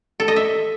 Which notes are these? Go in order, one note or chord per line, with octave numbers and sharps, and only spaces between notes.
A4
D#5
E5